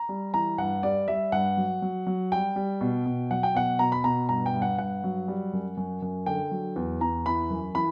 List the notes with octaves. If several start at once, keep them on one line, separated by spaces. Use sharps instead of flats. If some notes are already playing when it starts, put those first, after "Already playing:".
Already playing: A#5
G3
E3 A#5
G2 F#5
G3 D5
G3 E5
G2 F#5
F#3
F#3
F#3
G3 G5
G3
B2
B2
F#3 F#5
G5
B2 F#5
B2 A#5
B5
B2 A#5
G2 A#5
G5
G2
F#5
G2 F#5
F#3
G3
F#2
F#2
F#2
D3 G5
F#3
E2
E2 A#5
E3 B5
F#2
E3 B5